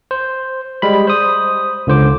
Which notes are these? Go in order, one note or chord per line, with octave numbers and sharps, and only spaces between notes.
C5
G3 G#3 B5
C5 D#6
C#2 D3 C5 D6